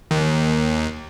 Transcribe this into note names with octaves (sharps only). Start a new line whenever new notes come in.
D#2